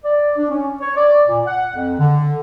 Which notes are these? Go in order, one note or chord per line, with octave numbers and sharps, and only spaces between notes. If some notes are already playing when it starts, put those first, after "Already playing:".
D5
D4
C#4
C#5
D5
A#2
F#5
F2
D3